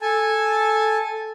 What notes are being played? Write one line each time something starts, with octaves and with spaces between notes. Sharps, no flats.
A4 G#5 A5